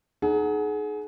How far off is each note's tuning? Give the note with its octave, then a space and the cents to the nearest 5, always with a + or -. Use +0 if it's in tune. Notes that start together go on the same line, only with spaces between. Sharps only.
D#4 -15 G#4 +30 F#5 +0